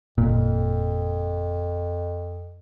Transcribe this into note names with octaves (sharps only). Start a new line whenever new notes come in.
G1 F2 A#2